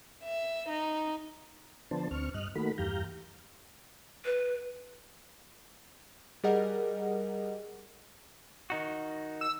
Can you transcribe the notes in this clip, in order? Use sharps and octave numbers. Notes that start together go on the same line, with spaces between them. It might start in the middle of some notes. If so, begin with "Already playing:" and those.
E5
D#4
D3 F3 B3 D4 C5 A5
D2 C4 C#6 F6
G2 D#5 F6 F#6
D#3 A3 A#3 F#4 B5
E2 G2 G4 F5 A#5 G6
B4
G3 G#4 A#4 D#5 F#5
D#3 D#4 F#4
E6